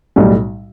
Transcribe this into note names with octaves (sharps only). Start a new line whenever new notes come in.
B1 A2 G3